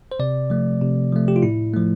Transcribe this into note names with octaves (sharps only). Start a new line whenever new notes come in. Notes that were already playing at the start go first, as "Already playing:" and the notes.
C5
C3 D5
F3 A3
C3
F3 A3
G4
F4
A2 E4
F3 A3